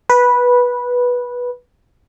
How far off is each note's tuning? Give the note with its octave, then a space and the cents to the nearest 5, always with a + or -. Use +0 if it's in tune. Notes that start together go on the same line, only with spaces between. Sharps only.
B4 -10